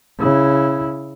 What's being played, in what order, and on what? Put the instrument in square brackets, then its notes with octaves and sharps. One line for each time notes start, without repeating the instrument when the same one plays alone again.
[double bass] C#3 E4